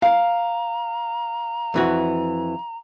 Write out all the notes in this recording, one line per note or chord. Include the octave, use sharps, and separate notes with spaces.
F5 A#5
F2 E3 F#4